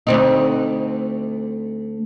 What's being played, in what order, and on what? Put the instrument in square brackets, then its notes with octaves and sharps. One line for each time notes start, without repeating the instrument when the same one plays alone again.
[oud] D2 C4 D#4